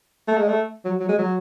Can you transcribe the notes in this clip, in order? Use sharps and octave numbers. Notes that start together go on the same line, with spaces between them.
A3
G#3
A3
F#3
F#3
G#3
F#3